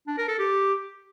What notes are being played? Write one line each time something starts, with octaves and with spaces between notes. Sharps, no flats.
D4
A#4
A4
G4